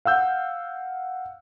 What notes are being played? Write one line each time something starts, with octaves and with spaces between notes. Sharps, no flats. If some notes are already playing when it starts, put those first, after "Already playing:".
F5 F#5 E6 G6